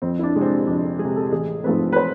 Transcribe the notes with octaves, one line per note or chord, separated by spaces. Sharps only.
F2 C4
E4
D4
C3 G#3
C4
D4
F2 D4
G#3 G#4
C3
A4
A1 G#4
G#2 F3 A3 C4 B4
B4
C5